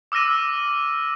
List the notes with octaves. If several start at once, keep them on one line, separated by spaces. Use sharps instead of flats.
D6 E6 F6 A#6 D#7